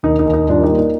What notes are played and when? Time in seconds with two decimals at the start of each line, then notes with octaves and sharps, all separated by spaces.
0.03 D#2 D#4
0.19 D#4
0.26 D#2
0.33 D#4
0.49 G2 D4 F4
0.63 D#4 G4
0.71 A#3
0.78 D#4